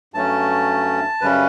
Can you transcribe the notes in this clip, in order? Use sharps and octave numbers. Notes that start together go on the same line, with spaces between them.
G2 F#3 A3 C#4 A5
F#2 C#3 G3 C#4 B4